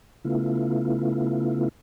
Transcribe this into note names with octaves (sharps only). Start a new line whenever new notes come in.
C#3 A3 B3 E4 F4